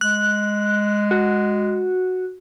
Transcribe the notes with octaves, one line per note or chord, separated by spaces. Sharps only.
G#3 F#6
F#4